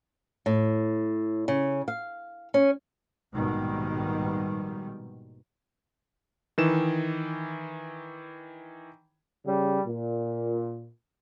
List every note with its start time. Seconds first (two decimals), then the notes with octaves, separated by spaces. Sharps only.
0.46 A2
1.48 C#3
1.88 F5
2.54 C#4
3.32 A#1 G#2 B2 D#3 G3
6.58 D#3 E3 E7
9.45 C#3 G3 C#4
9.86 A#2